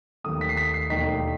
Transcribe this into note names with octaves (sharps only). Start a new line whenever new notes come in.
D#2 D#3 A3 D#6
B6
C7
B6
C7
E1 D#2 D#3 A3 D#4 B6